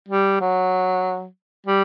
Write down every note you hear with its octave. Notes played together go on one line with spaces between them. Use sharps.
G3
F#3
G3